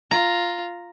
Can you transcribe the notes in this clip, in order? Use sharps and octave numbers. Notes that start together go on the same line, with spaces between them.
F4 A#5